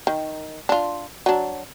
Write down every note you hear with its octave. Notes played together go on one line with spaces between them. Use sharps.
D#3
D4 F4
F#3 D4